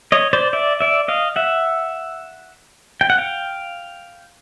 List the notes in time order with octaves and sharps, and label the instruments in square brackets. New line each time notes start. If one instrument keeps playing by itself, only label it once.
[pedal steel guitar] C#5 D#5
C5 D5
D5 E5
D5 E5
D#5 F5
E5 F#5
G5
F#5
F5 G5